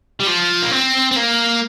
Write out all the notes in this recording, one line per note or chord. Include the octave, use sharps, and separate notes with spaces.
G3
F3
A#3
C4
C4
A#3